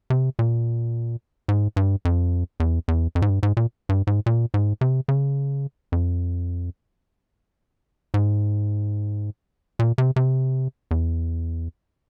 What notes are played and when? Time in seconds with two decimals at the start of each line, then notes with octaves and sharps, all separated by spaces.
0.10 C3
0.39 A#2
1.48 G#2
1.76 G2
2.05 F2
2.60 E2
2.88 E2
3.15 F2
3.22 G#2
3.30 G2
3.43 G#2
3.57 A#2
3.89 G2
4.07 G#2
4.26 A#2
4.54 G#2
4.81 C3
5.08 C#3
5.92 F2
8.14 G#2
9.79 A#2
9.98 C3
10.16 C3
10.91 E2